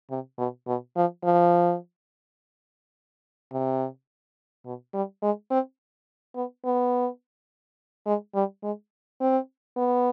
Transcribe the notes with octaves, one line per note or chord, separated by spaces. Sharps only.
C3
B2
B2
F3
F3
C3
B2
G3
G#3
C4
B3
B3
G#3
G3
G#3
C4
B3